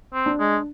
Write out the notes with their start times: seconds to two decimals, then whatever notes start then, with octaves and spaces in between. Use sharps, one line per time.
0.14 C4
0.26 D4
0.39 G#3